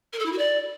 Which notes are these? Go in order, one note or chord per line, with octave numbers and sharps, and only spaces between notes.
A#4
A4
E4
F#4
D5